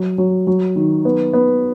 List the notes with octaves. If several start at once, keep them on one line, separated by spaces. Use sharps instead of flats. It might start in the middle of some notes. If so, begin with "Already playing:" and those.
Already playing: F#3
F#3
F#3
D#3
B3
B3